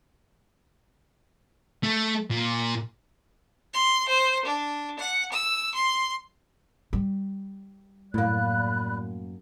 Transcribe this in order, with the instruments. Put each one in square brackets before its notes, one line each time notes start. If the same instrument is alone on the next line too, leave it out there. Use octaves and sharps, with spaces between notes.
[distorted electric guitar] A3
A#2
[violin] C6
C5
D4
F#5
E6
C6
[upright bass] G3
[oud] F#2 A#3 [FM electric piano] A2 [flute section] D5 B5 F#6